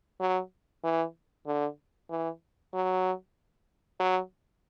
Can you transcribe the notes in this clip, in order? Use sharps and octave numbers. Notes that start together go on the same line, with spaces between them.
F#3
E3
D3
E3
F#3
F#3